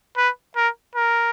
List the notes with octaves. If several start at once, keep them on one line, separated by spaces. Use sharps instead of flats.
B4
A#4
A#4